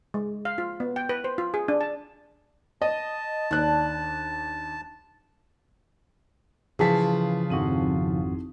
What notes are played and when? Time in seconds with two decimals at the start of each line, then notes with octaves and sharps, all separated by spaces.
0.14 G#3
0.45 F5
0.58 F4
0.80 B3
0.96 G5
1.09 B4
1.24 C5
1.38 F4
1.54 G#4
1.68 D4
1.81 A5
2.82 D#5 A5
3.51 D#2 D4 F#6
6.79 C#3 E3 F3 G#4 A5 B6
7.50 G#1 F2 C4 D#4 E4 F#4